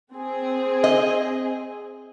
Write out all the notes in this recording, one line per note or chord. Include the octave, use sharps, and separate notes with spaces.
C4 G#4
D#5